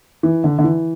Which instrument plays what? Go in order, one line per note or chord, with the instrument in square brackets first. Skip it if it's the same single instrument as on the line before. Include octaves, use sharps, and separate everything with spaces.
[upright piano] E3
D3
D3
E3